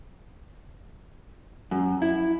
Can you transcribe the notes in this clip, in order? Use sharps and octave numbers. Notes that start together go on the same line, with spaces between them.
F#2
E4